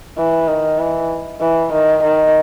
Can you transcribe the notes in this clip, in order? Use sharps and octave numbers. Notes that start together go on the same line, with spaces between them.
E3
D#3
E3
E3
D#3
D#3